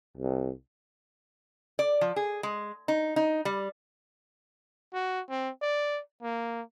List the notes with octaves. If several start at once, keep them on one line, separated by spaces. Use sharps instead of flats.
C2
D5
F3
G#4
G#3
D#4
D#4
G3
F#4
C4
D5
A#3